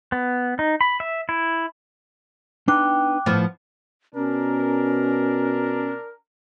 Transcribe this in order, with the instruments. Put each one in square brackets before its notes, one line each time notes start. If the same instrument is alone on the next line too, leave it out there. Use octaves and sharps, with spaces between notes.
[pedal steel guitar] B3
D#4
B5
E5
E4
[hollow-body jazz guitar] B3 D4 D#4 [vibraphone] G5 [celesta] D6 F#6
[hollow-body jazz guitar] A2 [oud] F3 B3
[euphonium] B2 [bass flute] C#4 [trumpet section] D4 A#4